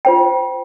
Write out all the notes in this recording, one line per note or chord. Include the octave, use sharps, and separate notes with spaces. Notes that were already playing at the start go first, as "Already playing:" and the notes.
F4 C5 G5